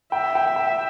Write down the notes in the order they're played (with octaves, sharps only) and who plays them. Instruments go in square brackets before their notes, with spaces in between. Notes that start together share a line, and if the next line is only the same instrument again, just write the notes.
[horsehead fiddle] E5 [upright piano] G5
[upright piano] G5
G5